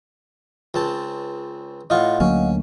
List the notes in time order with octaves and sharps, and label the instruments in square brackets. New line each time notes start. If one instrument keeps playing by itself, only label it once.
[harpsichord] C#2 C4 A5
[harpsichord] A2 F4 C#6 [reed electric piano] D#5 F5 F#5
[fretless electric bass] D2 F#3 A#3 [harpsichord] C#4